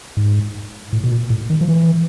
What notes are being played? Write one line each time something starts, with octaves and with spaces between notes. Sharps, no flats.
G#2
A2
B2
A#2
A2
D#3
F3
E3